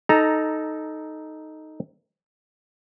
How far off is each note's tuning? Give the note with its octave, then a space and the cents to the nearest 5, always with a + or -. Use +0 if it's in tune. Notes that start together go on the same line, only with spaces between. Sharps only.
D#4 +0 A4 -10 A#5 -5